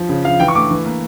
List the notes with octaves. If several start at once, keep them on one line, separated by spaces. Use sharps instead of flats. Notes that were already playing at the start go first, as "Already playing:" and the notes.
Already playing: F3
C#3
F3 F5
E3 G5
C#6
A3 D6
E3
A#3